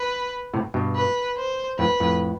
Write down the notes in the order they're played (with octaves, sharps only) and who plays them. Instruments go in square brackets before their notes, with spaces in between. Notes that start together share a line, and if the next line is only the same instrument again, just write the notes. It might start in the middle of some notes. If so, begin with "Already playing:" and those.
Already playing: [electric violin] B4
[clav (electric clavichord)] A2 C3
G2 B2
[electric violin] B4
C5
[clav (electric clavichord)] F2 A2 [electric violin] B4
[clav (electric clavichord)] F2 A2